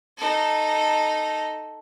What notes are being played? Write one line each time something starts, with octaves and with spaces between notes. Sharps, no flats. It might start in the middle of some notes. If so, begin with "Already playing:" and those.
D#4 A4